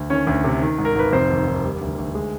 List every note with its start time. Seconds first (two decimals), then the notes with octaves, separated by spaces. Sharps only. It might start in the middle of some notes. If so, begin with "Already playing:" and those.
Already playing: D2
0.10 D#3 C#4 C#5
0.27 D2
0.44 C3
0.61 D#3
0.78 G#2
0.85 A#4
0.95 G#1 B4
1.12 F1 C4 C5
1.30 D#2
1.46 D#2
1.64 G3
1.81 D2
1.98 D2
2.15 G#3